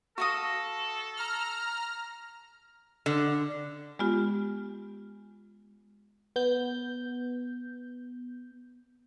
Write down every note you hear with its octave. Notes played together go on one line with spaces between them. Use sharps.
F#4 A4 F5 C#6 D#6 A#6
A#5 F6
D3
G#3 B3 F4 G4
B3 G6